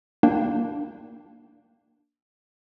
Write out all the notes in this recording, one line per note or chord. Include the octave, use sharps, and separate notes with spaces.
A#3 D4 G5